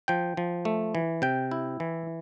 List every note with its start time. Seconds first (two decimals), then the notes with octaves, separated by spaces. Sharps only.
0.08 F3 G5
0.37 F3
0.65 A3
0.95 E3
1.22 C3 G5
1.51 E4
1.80 E3